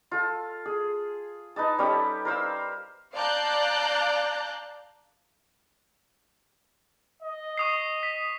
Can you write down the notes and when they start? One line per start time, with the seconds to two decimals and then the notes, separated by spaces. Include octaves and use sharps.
0.11 F4 A4
0.66 G#4
1.56 D#4 B4 D#5 A5
1.79 G3 C#4 G4 A4
2.25 A#4 C5 F5 E6
3.15 D5 F5 A5 A#5 F#6 G6
7.23 D#5
7.57 C#6 D#6 C7
8.03 B6